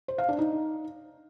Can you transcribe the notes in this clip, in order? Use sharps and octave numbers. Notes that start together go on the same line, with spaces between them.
C5
F5
D4
D#4